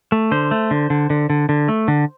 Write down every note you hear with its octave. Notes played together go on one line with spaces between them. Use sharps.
A3
D3 C5
A3
D3
D3
D3
D3
D3
A3
D3